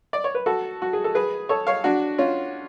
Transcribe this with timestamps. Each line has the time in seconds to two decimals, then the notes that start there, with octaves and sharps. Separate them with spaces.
0.13 D5
0.24 C#5
0.35 B4
0.46 F#4 A4
0.82 F#4
0.93 G#4
1.04 A4
1.15 G#4 B4
1.49 A4 C#5
1.67 C#5 F5
1.84 D4 F#4
2.18 C#4 F4